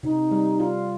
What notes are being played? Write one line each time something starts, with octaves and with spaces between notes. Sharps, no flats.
C3 D#4
G3
F4